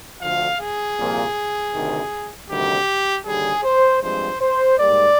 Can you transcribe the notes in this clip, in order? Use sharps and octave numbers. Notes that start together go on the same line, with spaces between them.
D2 D3 F3 F5
G#4
C2 A#2 F3 A#3
D2 C3 D#3
D2 C3 D#3 G3 G4
D#2 D3 G3 G#4
C5
G2 F3 G#3 C4 C5
C5
G#2 G3 A#3 D5